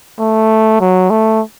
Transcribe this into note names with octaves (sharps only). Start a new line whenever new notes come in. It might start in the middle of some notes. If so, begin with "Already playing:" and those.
A3
F#3
A3